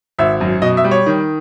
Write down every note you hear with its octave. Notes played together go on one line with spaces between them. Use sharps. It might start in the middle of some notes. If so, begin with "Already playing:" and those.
G#1 E5
F#2
B2 D#5
E5
G3
C#5
D#3